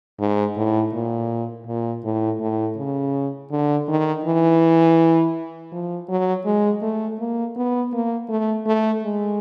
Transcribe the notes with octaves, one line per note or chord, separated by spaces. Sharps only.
G#2
A2
A#2
A#2
A2
A2
C#3
D3
D#3
E3
F3
F#3
G#3
A3
A#3
B3
A#3
A3
A3
G#3